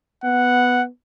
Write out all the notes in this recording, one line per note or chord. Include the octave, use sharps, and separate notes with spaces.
B3 F#5